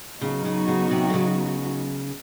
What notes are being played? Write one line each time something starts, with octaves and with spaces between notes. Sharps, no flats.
C#3 F#3 B3 D#4 F#4
C#3
C#3
C3
D3
C#3